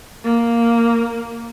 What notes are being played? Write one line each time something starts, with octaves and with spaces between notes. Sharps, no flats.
A#3